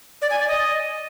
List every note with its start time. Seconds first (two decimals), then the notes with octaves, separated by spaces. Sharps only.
0.22 D5
0.30 G#5
0.39 D5
0.48 D#5